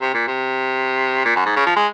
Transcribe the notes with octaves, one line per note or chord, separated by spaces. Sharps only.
C3
A#2
C3
A#2
F#2
G#2
C#3
F3
G#3